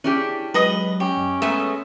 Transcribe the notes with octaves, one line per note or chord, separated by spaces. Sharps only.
C#4 D4 E4 G4 G#4
F#3 G#3 B4 D#5 D#6
C#4 G4
F#2 D#5
G#3 A3 B3 C#5 E5 A#5